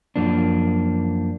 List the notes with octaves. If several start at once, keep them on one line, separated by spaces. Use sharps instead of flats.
F#2 F3 A#3 D4